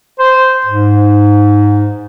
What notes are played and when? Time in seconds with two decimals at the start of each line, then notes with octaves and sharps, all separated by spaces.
0.19 C5
0.66 G#2